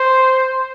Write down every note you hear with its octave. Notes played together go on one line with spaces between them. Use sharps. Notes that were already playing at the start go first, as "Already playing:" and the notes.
Already playing: C5